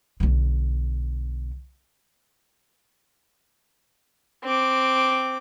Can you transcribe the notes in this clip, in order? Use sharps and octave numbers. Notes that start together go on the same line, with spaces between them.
B1 D3
C4 D6